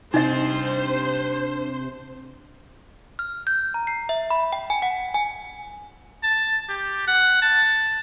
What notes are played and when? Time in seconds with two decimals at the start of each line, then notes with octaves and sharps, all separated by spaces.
0.14 C3 D4 D#4 C5 D#5 G5
3.19 F6
3.47 G6
3.74 A#5
3.87 C7
4.09 E5
4.31 B5
4.53 G5
4.70 G#5
4.82 F#5
5.14 G#5
6.23 A5
6.68 G4
7.08 F#5
7.42 A5